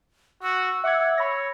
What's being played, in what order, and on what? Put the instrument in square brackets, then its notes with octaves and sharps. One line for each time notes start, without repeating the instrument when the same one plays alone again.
[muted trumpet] F#4 [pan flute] E6
[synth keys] E5 D6 G#6 [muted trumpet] F#5
[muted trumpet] C#5 [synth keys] B5 A#6